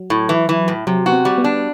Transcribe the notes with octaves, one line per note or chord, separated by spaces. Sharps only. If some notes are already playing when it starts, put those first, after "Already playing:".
Already playing: F#3
A2
E3
E3
A2
C3 F#3
B3 F#4
C4
G3
B3
D4